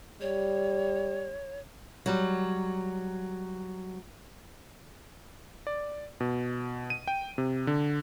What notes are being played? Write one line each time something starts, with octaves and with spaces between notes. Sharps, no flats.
G3 C#5
F#3 G3
D5
B2
D#7
G5
C3
D3